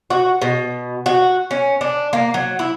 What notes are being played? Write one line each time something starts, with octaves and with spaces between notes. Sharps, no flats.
F#4
B2
F#4
C#4
D4
A#3
F#3
E4